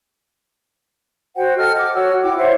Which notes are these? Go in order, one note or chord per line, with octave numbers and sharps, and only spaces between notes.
F#4 C5 F#5 G5
A4 D#5 F#5 F6
D6
F#4 C#5 F#5 E6
E4 G5 D6
C5 C#5 E5 F#5